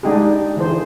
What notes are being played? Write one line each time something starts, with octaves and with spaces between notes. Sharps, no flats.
G#3 D4 D#4 G4 G#4
D3 E3 G#4 C5